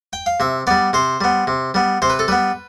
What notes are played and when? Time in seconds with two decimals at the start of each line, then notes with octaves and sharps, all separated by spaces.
0.13 G5
0.26 F5
0.40 C3 E5
0.67 G3 B3 D5
0.93 C3 C5
1.21 G3 B3
1.47 C3
1.74 G3 B3
2.02 C3 C5
2.10 B4
2.19 A4
2.28 G3 B3 B4